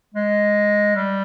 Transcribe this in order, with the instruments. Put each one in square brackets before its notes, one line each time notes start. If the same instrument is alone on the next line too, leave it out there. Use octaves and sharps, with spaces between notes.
[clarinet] G#3
G3